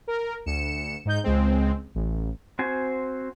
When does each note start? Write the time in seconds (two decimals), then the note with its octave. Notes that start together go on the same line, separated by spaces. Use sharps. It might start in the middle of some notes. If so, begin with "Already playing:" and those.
0.08 A#4
0.46 D2 C#7 E7
1.05 G#2 D#4 G6
1.24 C#2 G#3 C4
1.95 A1
2.59 C4 F#4 C5 G#5